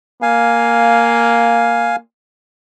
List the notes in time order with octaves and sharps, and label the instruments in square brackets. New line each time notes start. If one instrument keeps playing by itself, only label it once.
[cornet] A#3 [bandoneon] F5 G#5